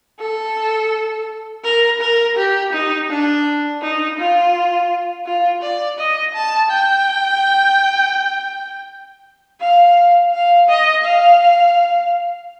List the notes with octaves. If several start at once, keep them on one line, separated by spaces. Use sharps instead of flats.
A4
A#4
A#4
G4
D#4
D4
D#4
F4
F4
D5
D#5
A5
G5
F5
F5
D#5
F5